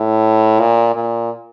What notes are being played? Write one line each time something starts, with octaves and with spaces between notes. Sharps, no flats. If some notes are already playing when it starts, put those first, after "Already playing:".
Already playing: A2
A#2
A#2